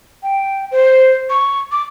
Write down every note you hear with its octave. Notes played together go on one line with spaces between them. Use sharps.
G5
C5
C#6
D6